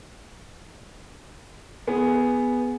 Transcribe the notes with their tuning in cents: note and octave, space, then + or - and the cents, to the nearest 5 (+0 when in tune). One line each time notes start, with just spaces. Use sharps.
B3 +0 G#4 +0